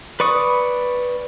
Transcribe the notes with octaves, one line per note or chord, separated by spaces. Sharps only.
B4 D5 C#6 D#6